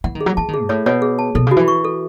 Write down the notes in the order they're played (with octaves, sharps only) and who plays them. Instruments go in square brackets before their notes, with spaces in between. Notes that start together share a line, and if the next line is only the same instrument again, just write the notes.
[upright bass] E3 [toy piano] F#5
[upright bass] D#3
[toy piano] G#4
[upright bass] F#3
[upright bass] E3 [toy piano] A5
[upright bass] D#3
[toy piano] G#4
[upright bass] G#2
[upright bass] A2 [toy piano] C#5
[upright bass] B2 [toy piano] C#5
[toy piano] G#4
A5
[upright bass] B2 [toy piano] A4
[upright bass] C#3 [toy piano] F#4
[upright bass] E3
[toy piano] C#6
A4